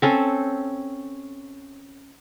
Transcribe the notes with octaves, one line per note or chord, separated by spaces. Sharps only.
C4 C#4 A4